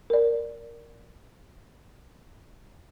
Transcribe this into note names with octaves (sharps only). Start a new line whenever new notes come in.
A#4 D5